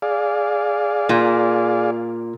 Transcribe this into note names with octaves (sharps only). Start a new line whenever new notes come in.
G#4 D5 F5
A#2